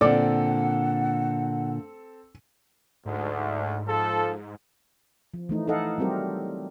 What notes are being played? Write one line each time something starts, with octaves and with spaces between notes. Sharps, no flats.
A#2 D3 C4 A4 D5 F#5
D2 G#2
F3 A4
F3
E3 A3 D#4
D#4 E4 A4 D#5 F5 F#5
F#3 G3 C4 G4 A#4